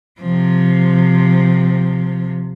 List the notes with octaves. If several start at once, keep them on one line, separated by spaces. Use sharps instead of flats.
C3 F3